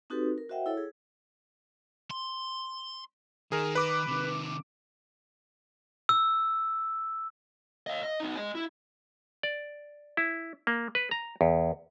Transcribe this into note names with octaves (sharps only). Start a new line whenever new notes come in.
C4 D#4 F#4 G4 A4 B4
A#4
F#4 C5 D#5 E5 F#5 G5
E4 A4 C#5
G#4
C6
D#3 G#4 A#4
B4 D6
C3 D#3
E6
D#5 F5
D#5
B3 D#4
D#5 G#5
E4
D5
E4
A#3
B4
A#5
E2